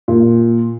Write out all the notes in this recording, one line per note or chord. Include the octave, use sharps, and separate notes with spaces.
A#2